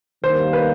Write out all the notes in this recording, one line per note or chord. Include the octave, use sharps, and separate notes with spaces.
D#2 D#3 G3 A#3 C5
B4